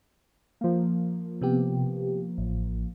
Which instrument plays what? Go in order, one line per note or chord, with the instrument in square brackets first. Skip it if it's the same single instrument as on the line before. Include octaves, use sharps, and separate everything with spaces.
[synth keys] F3 A#3
[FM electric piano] C3 B3 G4
A1